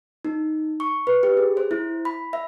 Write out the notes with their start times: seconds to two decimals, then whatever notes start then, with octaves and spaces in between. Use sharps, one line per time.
0.25 D#4
0.80 C#6
1.07 B4
1.23 G4
1.37 G#4
1.57 C5
1.71 E4
2.05 B5
2.33 E5